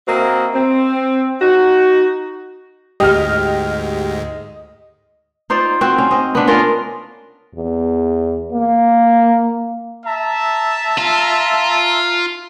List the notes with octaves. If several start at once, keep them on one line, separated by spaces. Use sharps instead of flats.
A#3 C4 E4 F#4 D#5
C4
D#4 F#4
D2 G#2 G#3 G4 D#5 F6
D#4 F4 C5 D5
C4 F#4 C5
C#4
C4 D#5
B3 D4
C#4 F4 A#4
E2
A#3
E5 A5 A#5
F4